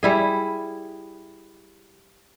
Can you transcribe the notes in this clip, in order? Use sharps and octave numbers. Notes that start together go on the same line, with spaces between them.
G3 E4 G#4